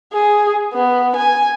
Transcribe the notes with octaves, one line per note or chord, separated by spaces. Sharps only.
G#4
B3
G#5